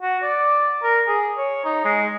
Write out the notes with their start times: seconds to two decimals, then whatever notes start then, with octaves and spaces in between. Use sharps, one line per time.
0.02 F#4
0.23 D5
0.83 A#4
1.08 G#4
1.38 C#5
1.65 D#4
1.85 G#3